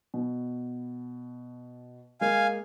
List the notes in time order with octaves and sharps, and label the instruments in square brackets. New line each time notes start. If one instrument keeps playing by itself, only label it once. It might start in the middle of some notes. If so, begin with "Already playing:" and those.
[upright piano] B2
[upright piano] G#3 A#3 [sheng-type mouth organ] F5 G#5